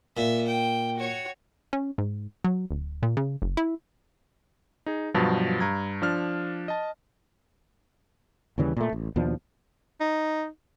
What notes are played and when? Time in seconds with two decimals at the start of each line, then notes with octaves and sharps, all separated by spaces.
0.17 A#2 E5
0.47 G5
0.97 F#4 C#5
1.73 C#4
1.98 G#2
2.44 F#3
2.71 D1
3.03 A#2
3.17 C#3
3.42 F#1
3.57 E4
4.86 D#4 G#4
5.14 G2 B2 F3 F#3
5.60 G2 A#5 G#6
6.02 F3 D4 F6
6.68 D#5 A5
8.58 D#2 C#3 E3 G3
8.76 A#2 A3
8.93 A1
9.16 D#2 B2 F3 D4
10.00 D#4